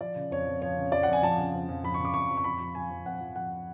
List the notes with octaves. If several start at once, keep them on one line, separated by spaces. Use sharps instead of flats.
F3 D5
C#3
F2 C#5
F2
F3 C#5
C#3
F2 D5
F#5
F2 G#5
F3 A5
C#3
F2
F2
F3 B5
C#6
C#3
D6
F2 C#6
F2
C#6
F2 B5
F3
F3 G#5
F2
F2 F#5
F3
F3 F#5